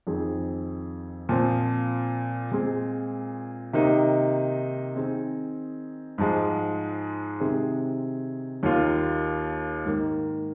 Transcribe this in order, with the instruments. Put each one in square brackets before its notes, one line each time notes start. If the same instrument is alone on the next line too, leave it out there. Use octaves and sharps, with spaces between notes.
[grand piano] F2 D#3 C4 G#4
A#2 F3 C4
A#2 G#3 C4 G#4
C3 D#3 A#3 D#4
D#3 C4 G#4
G#2 F3 G#3
C3 D#3 C4 G#4
D#2 D#3 A#3 F4
G#2 D#3 A#3